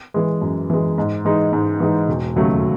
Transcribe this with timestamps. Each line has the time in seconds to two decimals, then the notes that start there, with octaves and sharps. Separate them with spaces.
0.14 E3 G#3
0.41 F#2
0.70 E3 G#3
0.98 G#2
1.25 E3 G#3 D#4
1.53 G#2
1.80 E3 G#3 D#4
2.09 E1
2.36 D#2 C#3 F#3 A3